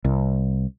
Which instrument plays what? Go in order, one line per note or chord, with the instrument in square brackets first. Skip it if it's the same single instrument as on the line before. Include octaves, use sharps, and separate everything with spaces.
[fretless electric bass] C2